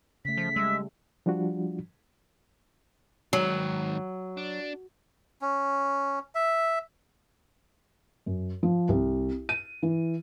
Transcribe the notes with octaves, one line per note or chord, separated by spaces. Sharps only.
C#3 A3 B6
F3
G3 G#3 E5
F3 G3 D4 F4 F#4
G#2 D#3 F#3
D4
C#4
E5
F#2
F3
C2
D#7
E3